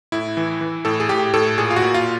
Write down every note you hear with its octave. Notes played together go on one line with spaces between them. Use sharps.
A2 E4
E3
E3
A2 A4
G#4
A2 G4
A2 A4
A#2 G#4
F4
F#4
A#2
F4